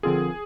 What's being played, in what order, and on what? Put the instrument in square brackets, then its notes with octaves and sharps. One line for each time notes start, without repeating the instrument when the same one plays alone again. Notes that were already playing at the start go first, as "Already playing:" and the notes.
[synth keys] D3 F3 C4 F4 A#4 [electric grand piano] G#4